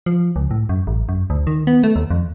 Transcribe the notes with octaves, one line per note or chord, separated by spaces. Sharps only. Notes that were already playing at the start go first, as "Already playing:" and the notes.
F3
C#2
A2
F#2
A1
F#2
D2
D#3
B3
A3
D#2
F2